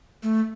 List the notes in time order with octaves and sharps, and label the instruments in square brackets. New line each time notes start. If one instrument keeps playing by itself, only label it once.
[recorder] A3